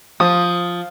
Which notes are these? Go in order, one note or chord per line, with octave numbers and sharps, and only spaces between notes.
F3 D#6